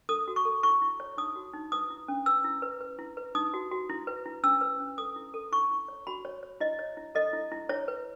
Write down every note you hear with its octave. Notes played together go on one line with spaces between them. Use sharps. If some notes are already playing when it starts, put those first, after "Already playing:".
A4 D#6
F#4
C#6
A4
E4 C#6
E4
C#5
D#4 D#6
F#4
D#4
B4 D#6
E4
C#4
B4 E6
E4
B4
B4
E4
B4
D#4 D#6
F#4
F#4
E4
B4
E4
C#4 E6
B4
C#4
A4 D#6
E4
A4
E4 C#6
E4
C#5
F#4 B5
C#5
C#5
E4 D#5
C#5
E4
A4 D#5
E4
E4
E4 C#5
B4